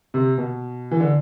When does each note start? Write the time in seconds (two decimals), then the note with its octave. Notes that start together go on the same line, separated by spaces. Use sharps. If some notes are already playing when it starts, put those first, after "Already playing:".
0.14 C3
0.38 B2
0.91 E3
1.00 D3